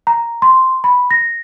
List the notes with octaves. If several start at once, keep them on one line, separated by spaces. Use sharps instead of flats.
A#5
C6
B5
A#6